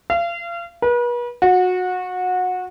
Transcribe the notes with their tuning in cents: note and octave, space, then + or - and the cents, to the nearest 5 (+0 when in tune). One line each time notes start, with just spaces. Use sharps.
F5 -35
B4 -40
F#4 -25